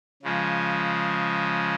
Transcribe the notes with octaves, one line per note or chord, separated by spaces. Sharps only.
C#3 F3 G#3